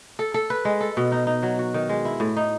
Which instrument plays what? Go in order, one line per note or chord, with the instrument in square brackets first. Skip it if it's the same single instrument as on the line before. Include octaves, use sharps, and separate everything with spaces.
[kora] A4
A4
B4
G#3
A4
B2
D#4
D#4
F#3
F#4
D#3
G#3
E4
A2
D#4